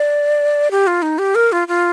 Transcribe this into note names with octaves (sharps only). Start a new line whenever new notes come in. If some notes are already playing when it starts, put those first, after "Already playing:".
Already playing: D5
G4
F4
D#4
G4
A#4
F4
F4